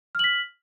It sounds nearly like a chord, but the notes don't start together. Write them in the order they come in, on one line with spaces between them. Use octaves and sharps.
F6 F#7 B6